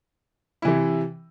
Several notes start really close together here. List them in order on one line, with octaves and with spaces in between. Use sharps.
E4 E3 C3